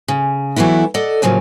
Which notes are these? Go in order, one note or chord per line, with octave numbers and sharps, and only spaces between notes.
C#3
E3 F#3 A3 B3 E4
A4 D5 D#5 F#5
A2 C#3 F3 F#3 A#3